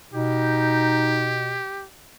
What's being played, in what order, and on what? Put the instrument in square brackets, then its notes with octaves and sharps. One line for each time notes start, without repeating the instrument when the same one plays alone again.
[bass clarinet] B2 [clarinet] D#4 [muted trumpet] G4